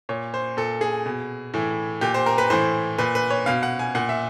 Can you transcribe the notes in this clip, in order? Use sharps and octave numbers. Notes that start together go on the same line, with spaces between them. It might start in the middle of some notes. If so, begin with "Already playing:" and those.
A#2 C#5
C5
A#2 A4
G#4
B2
A2 E3
A#2 G4
C5
A#4
B4
A2 E3 C5
A#2 B4
B4
C#5
B2 F5
F#5
G#5
A#2 F#5
E5